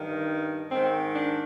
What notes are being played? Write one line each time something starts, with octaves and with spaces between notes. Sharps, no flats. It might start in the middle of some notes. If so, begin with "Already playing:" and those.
Already playing: G2 D#3
G#2 D#3 C4
D4